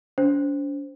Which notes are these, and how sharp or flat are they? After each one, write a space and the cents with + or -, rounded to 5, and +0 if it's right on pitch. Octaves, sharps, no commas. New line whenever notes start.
D4 -45 C5 +0